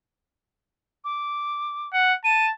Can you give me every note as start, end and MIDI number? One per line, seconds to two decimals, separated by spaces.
1.04 1.88 86
1.93 2.13 78
2.24 2.51 81
2.24 2.46 99